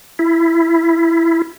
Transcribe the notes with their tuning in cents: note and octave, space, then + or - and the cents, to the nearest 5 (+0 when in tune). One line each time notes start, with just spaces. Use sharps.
E4 +10